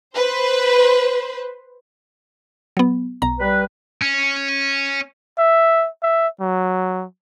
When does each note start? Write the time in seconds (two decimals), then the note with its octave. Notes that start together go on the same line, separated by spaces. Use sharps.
0.16 B4 C5
2.77 F#3 B3
3.22 B1 A#5
3.40 G3 B4
4.02 C#4
5.38 E5
6.03 E5
6.41 F#3